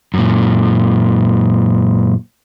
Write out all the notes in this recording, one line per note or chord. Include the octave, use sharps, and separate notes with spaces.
F#2 A#2